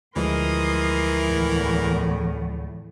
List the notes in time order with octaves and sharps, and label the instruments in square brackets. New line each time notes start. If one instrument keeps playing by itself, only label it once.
[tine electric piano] D2 F3 G#3 [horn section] E3 E4 A#4 [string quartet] C6 D#6
[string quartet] E2 A2